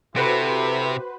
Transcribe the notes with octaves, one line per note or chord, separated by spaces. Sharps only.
C3 E4 F#4 G4 A4 B4 C5 B5